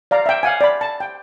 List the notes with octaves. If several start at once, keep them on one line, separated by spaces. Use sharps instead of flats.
D5 F5 A#5
E5 G5
F5 F#5 G#5
D5 B5
A5
G5